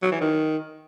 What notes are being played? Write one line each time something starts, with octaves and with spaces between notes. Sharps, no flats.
F#3
E3
D#3